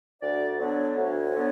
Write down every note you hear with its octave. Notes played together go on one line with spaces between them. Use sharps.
D2 D5
D3 F#3 B3 D4 C#5
D2 C#5
D3 F#3 B3 D4